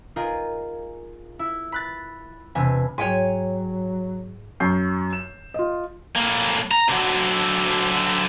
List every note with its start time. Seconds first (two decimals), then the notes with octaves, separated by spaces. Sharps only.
0.16 D#4 F4 G#4 A#4
1.39 E4
1.72 B5 F#6 A6
2.55 E1 C3 G#5 B5
2.98 G#2 F#3 C#5 G5 G#5
4.60 F#2 C#6 G6 C7
5.13 E7
5.54 F4 D#5
6.15 A2 A#3
6.71 A#5
6.89 D3 F#3